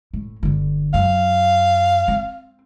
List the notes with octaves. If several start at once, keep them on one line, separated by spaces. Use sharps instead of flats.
A2
G1 D3
F#2 F5
C4